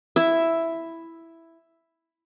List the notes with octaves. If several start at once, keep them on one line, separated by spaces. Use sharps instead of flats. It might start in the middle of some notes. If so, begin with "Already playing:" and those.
E4 E5